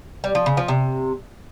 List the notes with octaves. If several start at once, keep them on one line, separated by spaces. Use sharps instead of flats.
G3
F3
C#3
F3
C3